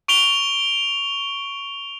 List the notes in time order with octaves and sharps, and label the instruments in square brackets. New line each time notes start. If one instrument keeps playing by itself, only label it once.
[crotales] C#6 D7 F7 G7